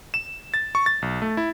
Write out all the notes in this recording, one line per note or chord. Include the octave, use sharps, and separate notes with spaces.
E7
A6
C#6
A6
B1
A3
E4